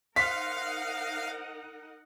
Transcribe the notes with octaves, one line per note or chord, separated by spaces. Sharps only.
D#4 A#4 C5 F5 F#5 B6